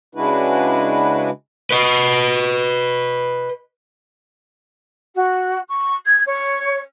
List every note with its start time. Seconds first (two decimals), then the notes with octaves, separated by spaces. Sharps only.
0.15 C#3 G#3 D4 E4 F#4 B4
1.71 B4 D#5
5.15 F#4
5.69 C#6
6.06 G#6
6.25 C#5